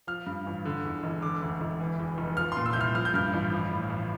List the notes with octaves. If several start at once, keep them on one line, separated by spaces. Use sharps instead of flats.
F3 F6
G2
A1
D3
E2
E1
D3 D6
D2
E1
E3
E2
F1
F3 F6
A#2 C6
E6
G6
C2 F6
F3 F6
G6
G2 F6
A1
F3
A2
A1